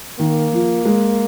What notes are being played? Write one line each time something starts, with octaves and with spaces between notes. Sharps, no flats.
D#3 A#3
F3
G#3